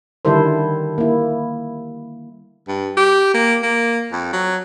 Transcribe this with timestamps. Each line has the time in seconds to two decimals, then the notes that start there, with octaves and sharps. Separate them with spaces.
0.25 D3 D#3 G3 E4 A4 C5
0.98 A#3 E4
2.68 G2
2.97 G4
3.34 A#3
3.63 A#3
4.12 F2
4.33 F#3